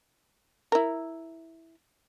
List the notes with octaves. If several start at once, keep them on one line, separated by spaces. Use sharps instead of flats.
E4 A#4